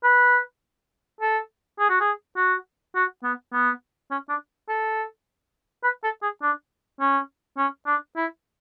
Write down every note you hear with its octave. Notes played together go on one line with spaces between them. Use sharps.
B4
A4
G#4
F#4
G#4
F#4
F#4
B3
B3
C#4
D4
A4
B4
A4
G#4
D4
C#4
C#4
D4
E4